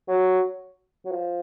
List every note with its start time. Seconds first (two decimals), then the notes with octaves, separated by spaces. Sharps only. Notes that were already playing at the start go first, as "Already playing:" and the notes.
0.08 F#3
1.05 F#3
1.11 F3